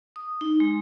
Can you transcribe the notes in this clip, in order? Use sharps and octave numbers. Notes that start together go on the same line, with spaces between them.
D#6
D#4
G#3